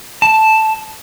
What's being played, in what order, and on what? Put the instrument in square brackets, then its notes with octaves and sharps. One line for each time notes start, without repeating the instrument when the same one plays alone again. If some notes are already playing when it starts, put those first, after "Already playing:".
[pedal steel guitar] A5